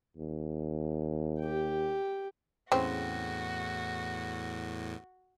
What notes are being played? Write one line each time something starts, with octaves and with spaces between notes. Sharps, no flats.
D#2
G4 G5
E2 A2 C#3 C4 F#4